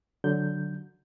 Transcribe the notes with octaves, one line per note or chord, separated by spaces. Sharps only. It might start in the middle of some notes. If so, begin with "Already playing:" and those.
D3 F#3 G6